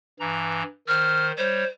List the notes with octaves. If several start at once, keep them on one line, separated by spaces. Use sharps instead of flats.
G2 E3 A#5
D#3 C5 F6
G3 C5 C#5